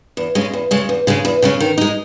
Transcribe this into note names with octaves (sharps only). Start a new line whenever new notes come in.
E2
C#3 G#3 C#4
E2
C#3 G#3 C#4
E2
C#3 G#3 C#4
E2
C#3 G#3 C#4
D#3
G#3 D#4